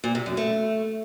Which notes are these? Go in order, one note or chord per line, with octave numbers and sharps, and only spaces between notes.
A#2
C3
F#2
A3